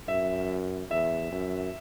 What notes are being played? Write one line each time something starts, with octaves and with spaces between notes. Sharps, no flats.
F#2 E5
E2 E5
F#2